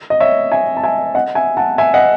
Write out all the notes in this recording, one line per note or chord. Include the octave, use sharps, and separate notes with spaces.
D#5
C#5 E5
E5 G#5
A5
E5 G#5
D#5 F#5
E5 G#5
F#5 A5
E5 G#5
D#5 F#5